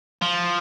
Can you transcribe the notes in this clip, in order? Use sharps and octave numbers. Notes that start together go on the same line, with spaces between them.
F3